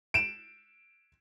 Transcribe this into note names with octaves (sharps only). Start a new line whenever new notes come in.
D7 E7